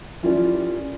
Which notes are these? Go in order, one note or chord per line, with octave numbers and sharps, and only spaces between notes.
C#4 E4 F4 G4 A#4 D5